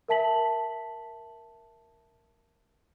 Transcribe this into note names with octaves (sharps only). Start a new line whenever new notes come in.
A#4 E5 A5 B6 F#7